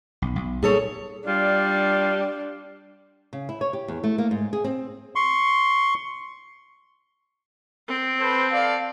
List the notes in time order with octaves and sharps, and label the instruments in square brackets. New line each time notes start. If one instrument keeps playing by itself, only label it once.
[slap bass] B1
B1
[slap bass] A#2 G3 [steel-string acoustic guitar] G#4 A4 C#5
[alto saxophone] G3 [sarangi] D4 [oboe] F4
[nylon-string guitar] C#3
E4
C#5
G4
E2
A3
A#3
G#2
G#4
C4
[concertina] C6 C#6
[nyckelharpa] C4
[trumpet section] A4 B4 C5
A4 D5 F5